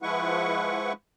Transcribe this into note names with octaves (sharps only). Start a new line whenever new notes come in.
F3 G#3 E4 B4 F#5 C#6